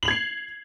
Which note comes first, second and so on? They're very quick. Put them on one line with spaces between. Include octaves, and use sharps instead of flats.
F#7 F7 G#6 C7